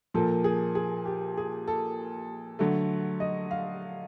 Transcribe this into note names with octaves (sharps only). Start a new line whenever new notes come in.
A#2 F3 A#3 A4
G#4
G#4
G4
G#4
A4
D3 F#3 A3
D#5
F5